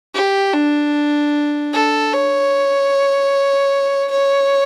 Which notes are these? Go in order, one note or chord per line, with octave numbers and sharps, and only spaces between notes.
G4
D4
A4
C#5
C#5